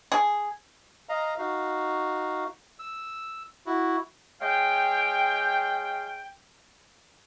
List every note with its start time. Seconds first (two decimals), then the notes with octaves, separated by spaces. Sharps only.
0.12 G#4
1.09 D#5 F5 A#5
1.39 D#4 F#4 F5
2.79 E6
3.66 E4 F#4
4.41 G#3 C#5 F5 G5